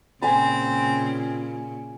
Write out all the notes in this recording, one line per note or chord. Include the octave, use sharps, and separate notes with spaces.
A#2 C#3 C4 G#5 B5